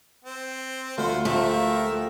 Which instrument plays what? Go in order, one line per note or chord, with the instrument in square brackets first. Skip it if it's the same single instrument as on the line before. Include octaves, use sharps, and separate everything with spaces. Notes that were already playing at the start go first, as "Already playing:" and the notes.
[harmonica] C4
[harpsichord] D2 [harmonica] B3 F#4 C5 [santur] F4
[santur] F3 G4 [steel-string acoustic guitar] A3 [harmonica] F#4 A#4 E5